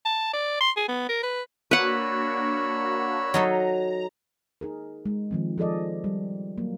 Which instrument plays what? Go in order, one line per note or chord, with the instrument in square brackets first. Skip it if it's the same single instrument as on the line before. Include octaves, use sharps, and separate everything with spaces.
[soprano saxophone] A5
D5
C6
G#4
B3
A#4
B4
[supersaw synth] A#3 D4 F#4 [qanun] B4 F#5 [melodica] C#5 B5 E6
[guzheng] F#3 D#4 A4 [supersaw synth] A#5
[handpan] D#4 G#4 A#4
G#3
D#3 F3 C4
F3 G#4 A4 D5 D#5
G3
F#3 A#3